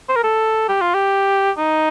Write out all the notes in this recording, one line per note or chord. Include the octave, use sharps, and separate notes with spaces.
C5
A#4
A4
G4
F4
G4
D#4